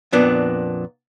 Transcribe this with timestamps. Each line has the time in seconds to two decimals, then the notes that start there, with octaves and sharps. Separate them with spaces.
0.13 F2 A#2 B3 D4